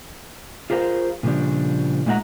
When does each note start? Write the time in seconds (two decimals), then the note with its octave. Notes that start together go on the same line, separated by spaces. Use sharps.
0.70 F4 G#4 A#4 C5 F5
1.23 A#2 C#3 F3 G3 D4
2.06 A#2 G#3 D#4 E5 F#5 A#5